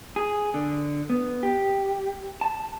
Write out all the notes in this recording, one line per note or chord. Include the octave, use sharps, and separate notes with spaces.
G#4
D3
B3
G4
A5